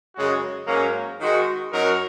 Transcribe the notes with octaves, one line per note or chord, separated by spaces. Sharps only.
F#2 C#3 G#3 F#4
G#2 F#3 A#3 C#4
D#3 G#3 F#4
F#2 F#3 D#4 F#4 A#4